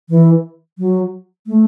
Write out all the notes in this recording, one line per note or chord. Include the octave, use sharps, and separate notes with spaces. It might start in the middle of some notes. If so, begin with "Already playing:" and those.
E3
F#3
A3